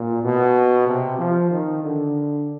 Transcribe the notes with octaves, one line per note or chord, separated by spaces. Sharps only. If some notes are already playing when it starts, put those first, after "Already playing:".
Already playing: A#2
B2
C3
F3
D#3
D3